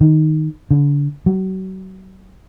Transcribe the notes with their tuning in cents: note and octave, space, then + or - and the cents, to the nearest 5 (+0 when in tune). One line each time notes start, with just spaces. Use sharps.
D#3 +0
D3 -35
F#3 +35